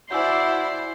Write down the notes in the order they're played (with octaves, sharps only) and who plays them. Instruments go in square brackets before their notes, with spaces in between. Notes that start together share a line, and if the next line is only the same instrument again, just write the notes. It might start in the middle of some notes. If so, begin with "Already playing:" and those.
[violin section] E4 D5 [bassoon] F#4 [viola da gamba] C5 [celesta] G#5 E6 G6